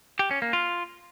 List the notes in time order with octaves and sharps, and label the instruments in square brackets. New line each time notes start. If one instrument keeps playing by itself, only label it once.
[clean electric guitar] G4
C#4
A#3
F4